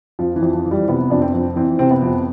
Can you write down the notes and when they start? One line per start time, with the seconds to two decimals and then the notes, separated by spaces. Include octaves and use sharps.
0.19 F2 F3
0.36 E3
0.42 F2
0.53 F3
0.66 E3
0.71 G3
0.89 C3 B3
1.10 F2 D4
1.22 C4
1.34 F2
1.56 E3 C4
1.79 C3 C4
1.91 B3
2.02 F2